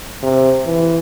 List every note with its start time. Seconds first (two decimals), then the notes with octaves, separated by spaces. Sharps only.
0.23 C3
0.66 E3